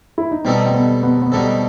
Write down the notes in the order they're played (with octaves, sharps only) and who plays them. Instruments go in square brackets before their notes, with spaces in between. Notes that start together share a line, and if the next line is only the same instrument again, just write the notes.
[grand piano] E4
D#4
[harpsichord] B2 G3 D#4 A4 [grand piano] C4
[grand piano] C4
B3
B3
B3
[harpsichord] B2 G3 D#4 A4 [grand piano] C4